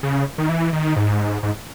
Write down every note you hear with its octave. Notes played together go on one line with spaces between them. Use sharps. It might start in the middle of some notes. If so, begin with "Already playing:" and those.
C#3
D#3
E3
D#3
G#2
G#2